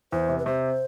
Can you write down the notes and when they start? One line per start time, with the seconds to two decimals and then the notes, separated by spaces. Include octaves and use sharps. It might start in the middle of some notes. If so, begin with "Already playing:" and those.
0.12 E2 C5
0.29 C3
0.38 B4
0.46 C3 C5